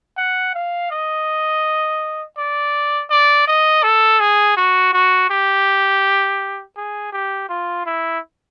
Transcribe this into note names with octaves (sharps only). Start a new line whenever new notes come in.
F#5
F5
D#5
D5
D5
D#5
A4
G#4
F#4
F#4
G4
G#4
G4
F4
E4